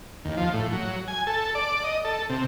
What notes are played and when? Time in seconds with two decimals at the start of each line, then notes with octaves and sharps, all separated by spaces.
0.25 D#2
0.37 F3
0.53 A2
0.72 F#3
1.08 G#5
1.27 A4
1.55 D5
1.84 D#5
2.05 A4
2.30 C3